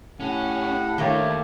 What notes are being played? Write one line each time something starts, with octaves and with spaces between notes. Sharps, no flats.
A2 C#4 G4 F#5
D#2 A3 A#3 D4 G4 C#5